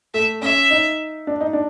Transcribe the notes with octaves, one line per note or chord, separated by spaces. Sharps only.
A3 E5
C#4 E5
D#4
D4
D#4
D4